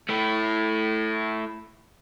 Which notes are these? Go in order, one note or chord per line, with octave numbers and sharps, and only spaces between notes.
A3 E4